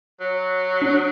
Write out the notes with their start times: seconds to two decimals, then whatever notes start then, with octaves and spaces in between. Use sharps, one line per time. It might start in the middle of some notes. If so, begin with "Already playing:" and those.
0.21 F#3
0.82 D4